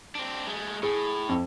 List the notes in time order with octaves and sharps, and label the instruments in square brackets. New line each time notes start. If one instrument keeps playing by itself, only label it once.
[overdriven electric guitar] C4 D4
G#3 A3
[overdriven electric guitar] A2 [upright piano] G#4
[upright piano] F2